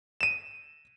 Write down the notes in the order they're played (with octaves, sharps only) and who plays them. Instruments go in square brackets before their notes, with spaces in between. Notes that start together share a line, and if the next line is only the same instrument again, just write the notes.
[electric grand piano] D#7 E7